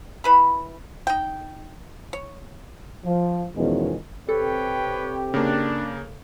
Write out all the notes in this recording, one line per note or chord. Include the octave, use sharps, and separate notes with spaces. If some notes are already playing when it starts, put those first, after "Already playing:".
E3 B4 B5
D#4 G5
C#5
F3
E2 B2 D#3 F3 G#3 C#4
C3 C4 G4 A4 B4 C#5 G5
C#3 A#3 D4